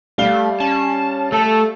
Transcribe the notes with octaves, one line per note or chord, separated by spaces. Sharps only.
G3 A3 F5 G7
C#4 A5
A3 A4